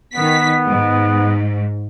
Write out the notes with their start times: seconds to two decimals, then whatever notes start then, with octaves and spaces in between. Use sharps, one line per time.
0.13 D#3 B3 B6
0.67 G#2